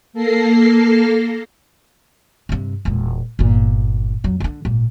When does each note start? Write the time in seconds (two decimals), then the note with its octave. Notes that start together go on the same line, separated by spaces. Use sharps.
0.13 A#3 A4 A#6 C7
2.49 G2 C3
2.85 E1 A#2
3.39 G1 A#2
4.24 F2 F#3
4.40 D3 D#3
4.65 G#1 A#2